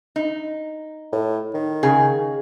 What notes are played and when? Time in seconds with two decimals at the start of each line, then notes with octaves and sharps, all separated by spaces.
0.16 D#4
1.12 A2
1.54 D#3
1.83 C#3 G#4